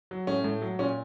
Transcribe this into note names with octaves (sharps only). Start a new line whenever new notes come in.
F#3
A2 C#4
A2
F#3
A#2 C#4